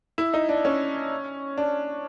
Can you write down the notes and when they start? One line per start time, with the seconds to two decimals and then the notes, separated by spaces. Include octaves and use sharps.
0.18 E4
0.34 D#4
0.49 D4
0.65 C#4
1.58 D4